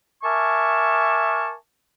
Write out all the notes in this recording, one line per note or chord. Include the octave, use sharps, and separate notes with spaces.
A#4 E5 G#5 A5 C#6 D6